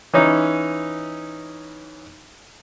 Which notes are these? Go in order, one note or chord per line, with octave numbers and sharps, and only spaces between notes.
E3 C#4 D#4